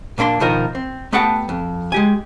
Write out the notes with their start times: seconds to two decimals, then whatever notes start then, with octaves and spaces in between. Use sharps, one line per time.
0.18 A#2 A#3 D4 B5 C6
0.40 B2 D#3 F3 D#4 A#4
0.75 C4
1.13 A3 B3 G4 F#5 G5 A5
1.49 F2
1.92 G#3 G4 G#5